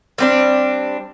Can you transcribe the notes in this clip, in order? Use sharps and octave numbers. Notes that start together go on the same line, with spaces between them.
G3 C4 D4